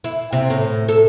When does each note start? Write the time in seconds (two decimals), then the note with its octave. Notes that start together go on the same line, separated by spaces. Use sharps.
0.04 E4
0.33 C3
0.50 A2
0.89 A4